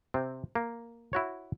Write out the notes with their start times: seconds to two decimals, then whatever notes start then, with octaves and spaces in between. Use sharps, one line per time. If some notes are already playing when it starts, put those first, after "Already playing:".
0.14 C3 C4
0.55 A#3
1.13 E4 F#4 C#5